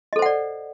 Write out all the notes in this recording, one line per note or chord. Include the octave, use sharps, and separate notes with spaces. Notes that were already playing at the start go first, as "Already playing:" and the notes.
A4 C5 D5 D#5 F#5